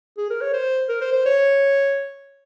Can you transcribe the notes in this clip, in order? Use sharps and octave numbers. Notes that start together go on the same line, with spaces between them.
G#4
A#4
C#5
C5
A#4
C5
C5
C#5